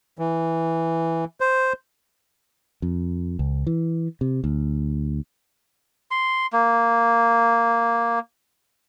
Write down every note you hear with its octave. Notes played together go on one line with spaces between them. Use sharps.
E3
C5
F2
C#2
E3
C3
D2
C6
A#3